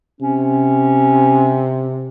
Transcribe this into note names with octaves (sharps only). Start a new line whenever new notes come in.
C3 C#4